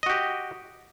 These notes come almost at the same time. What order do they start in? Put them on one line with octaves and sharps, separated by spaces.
D#5 F#4 G4